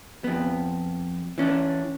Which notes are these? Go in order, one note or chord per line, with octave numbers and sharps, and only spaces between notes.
F2 B3
E3 C#4 D4